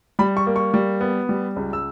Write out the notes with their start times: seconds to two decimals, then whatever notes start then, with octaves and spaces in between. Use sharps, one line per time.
0.19 G3 B5
0.37 C#6
0.47 A#3
0.56 C#6
0.74 G3
1.01 B3
1.29 G3
1.56 C#2
1.73 E6